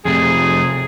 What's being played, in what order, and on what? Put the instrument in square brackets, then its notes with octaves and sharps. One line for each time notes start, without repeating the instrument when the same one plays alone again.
[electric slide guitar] F2 C3 A3 [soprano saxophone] G#4